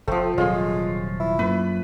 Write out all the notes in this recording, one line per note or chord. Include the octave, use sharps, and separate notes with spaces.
F1 F3 A3 C4 A4
D#1 C3 F#3 G#3 F4 C#5
E4
F#2 A#3 B4